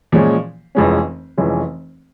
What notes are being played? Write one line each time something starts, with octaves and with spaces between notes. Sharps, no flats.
A#2 F3 G#3 C#4
F1 F2 E3 G#3 C#4
F1 F2 E3 G#3 C#4